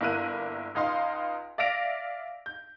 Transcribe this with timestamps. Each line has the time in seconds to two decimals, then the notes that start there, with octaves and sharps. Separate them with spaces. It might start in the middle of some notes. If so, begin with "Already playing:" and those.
0.01 G1 A#3 E4 A#4 F#6 D#7
0.75 C#2 D#4 F5 C6
1.58 D5 E5 F5 A#6 D7 F7
2.46 G6